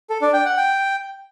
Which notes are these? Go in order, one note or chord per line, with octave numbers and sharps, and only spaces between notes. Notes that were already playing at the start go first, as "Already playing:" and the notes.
A4
D4
G5
F#5
G5